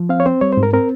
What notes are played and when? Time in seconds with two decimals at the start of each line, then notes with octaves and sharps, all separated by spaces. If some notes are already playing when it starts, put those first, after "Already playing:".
Already playing: F3
0.09 C4 F5
0.20 C#5
0.26 C4 C5
0.41 G3 C#5
0.53 C5
0.57 G#2
0.63 A#4
0.73 C4 A#4